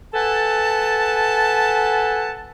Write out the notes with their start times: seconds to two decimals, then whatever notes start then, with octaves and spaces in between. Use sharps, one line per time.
0.14 A4 B4 F#5 G#5 A5